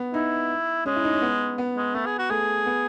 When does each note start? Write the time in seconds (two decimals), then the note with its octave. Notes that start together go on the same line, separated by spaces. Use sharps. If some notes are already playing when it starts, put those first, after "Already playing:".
Already playing: B3
0.14 D#4 E4
0.86 G#3 C#4
0.96 E4
1.04 D#4
1.14 C#4
1.22 B3
1.58 B3
1.77 G#3
1.94 A3 B3
2.06 G#4
2.19 F#4
2.30 A3 G#4
2.66 B3